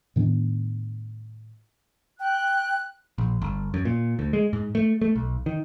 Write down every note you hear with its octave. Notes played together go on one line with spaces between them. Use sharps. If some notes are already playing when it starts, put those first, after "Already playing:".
A2 D#3 B3 D4
G5 F#6
A#1
G1
F#2
A#2
D2
G#3
G#2
A3
A3
B1
D#3